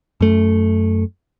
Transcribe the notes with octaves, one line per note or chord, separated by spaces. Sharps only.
F#2 A3